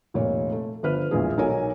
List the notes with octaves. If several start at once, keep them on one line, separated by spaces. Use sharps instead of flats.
F1 A#2 C#5
A3
G1 F3 B4 C5 F6
A#1 E2 A#2 G#3 F4 G#4
B1 D#4 A4 A#4 C#5 G#5